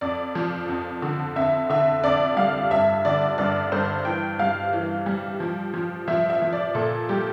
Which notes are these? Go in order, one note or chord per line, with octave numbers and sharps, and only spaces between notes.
F2 D5
F3
F2
D3
F2 E5
D3 E5
F2 D5
G3 F5
G2 E5
D3 D5
G2 D5
G2 C5
E3 G5
G3 F5
E3
G3
F3
F3
F3 E5
E5
F3
D5
A#2 A4
G3 G4